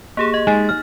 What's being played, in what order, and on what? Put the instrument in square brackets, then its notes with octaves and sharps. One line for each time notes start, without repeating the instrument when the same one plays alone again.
[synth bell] A#3 G4 G#4
D#5
[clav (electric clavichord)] G#3 [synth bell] D#4 A6
[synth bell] F6 A6